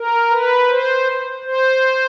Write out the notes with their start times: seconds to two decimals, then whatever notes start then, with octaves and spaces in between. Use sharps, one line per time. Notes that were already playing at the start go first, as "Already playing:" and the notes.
Already playing: A#4
0.31 B4
0.68 C5
1.43 C5